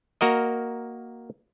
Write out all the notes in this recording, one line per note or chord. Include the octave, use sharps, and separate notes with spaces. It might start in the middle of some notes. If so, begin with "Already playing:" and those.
A#3 F#4 A#4 D#5